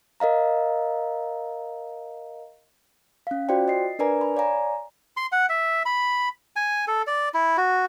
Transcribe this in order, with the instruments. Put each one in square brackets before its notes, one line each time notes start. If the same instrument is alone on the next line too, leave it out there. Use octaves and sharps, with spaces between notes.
[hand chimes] A#4 D#5 F5 A#5
C#4 F5
F4 F#4 C5 D5 G5
D#5 C7
D4 A#4 B4 D5 G#5 A#5
B5
C#5 D5 F5 G#5 A#5
[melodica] C6
F#5
E5
B5
G#5
A4
D5
E4
F#4